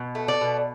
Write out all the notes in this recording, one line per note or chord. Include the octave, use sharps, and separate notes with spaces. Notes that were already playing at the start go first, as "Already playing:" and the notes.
Already playing: B2
A3
D5
B2